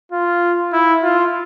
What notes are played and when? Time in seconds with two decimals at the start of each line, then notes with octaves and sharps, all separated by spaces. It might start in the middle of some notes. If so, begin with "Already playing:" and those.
0.12 F4
0.73 E4
1.03 F4